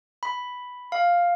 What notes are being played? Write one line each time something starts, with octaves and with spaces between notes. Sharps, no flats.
B5
F5